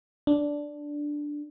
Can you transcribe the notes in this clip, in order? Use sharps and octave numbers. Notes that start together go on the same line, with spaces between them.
D4